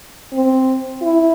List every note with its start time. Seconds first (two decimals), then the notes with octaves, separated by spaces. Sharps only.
0.33 C4
1.02 E4